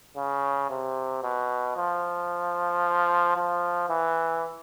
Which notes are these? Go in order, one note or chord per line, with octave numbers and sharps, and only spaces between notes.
C#3
C3
B2
F3
F3
E3